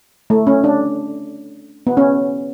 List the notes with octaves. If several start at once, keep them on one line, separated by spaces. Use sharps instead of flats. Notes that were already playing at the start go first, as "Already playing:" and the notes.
A3
C#4
D4
B3
C#4